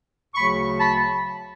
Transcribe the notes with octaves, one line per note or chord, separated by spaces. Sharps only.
D2 C#3 F#3 B5 C#6
A5 B5